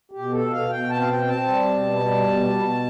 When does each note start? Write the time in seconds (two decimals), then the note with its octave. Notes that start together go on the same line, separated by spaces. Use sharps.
0.12 G4
0.19 B2
0.32 A4
0.45 B2
0.51 F5
0.70 B2 G5
0.90 A5
0.96 C4
1.01 F5
1.09 G5
1.22 C4
1.28 A5
1.48 G3
1.74 B2
1.99 G3
2.25 B2
2.50 B2